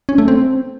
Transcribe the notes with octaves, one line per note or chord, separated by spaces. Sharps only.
C#4
A3
C4